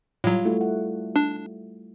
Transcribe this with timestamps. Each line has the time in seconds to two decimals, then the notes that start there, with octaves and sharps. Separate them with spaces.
0.24 A2 F#3 G3 F4
0.45 A3 E4 F#4
0.61 F#5
1.16 D4